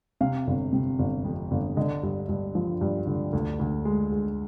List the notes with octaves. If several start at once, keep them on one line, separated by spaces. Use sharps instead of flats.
C3 F5
G1
C3
G1
F2
G1
D3 D#5
G2
G2
F3
G2
D3
D2
D2
G#3
G#3